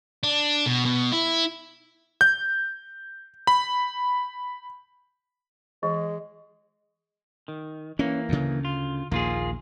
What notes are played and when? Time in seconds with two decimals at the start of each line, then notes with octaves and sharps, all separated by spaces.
0.23 D4
0.66 B2
0.85 B2
1.12 E4
2.21 G6
3.47 B5
5.83 E3 G#3
7.48 D#3
7.99 E3 A#3 C#4
8.29 D2 C#3
8.65 F4
9.12 A#1 D#2 A#3 F4 G#4